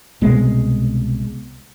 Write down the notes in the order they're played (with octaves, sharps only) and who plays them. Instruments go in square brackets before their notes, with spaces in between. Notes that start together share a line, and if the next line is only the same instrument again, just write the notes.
[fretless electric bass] C2 B2 G#3